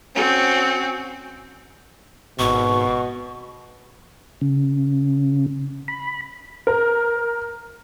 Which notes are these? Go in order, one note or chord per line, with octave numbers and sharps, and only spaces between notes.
C4 C#4 F#4
G#1 B2 C#6
C#3
B5
A#4